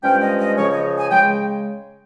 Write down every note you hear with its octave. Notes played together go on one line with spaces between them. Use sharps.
G2 F3 G#3 C#4 G5
D#5
D#5
C#2 C#3 F3 C#5
D#5
G#5
C#3 G#3 G5